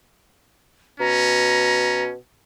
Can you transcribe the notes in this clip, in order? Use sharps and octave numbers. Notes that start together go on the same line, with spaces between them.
B2 C#4 A#5